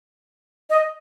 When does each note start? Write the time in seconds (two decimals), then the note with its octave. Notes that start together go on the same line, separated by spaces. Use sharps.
0.70 D#5